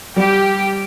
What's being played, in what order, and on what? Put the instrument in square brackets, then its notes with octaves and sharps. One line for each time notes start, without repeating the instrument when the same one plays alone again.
[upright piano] G3 [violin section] G4